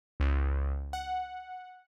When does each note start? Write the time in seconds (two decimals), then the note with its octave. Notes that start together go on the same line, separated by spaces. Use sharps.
0.20 C#2
0.93 F#5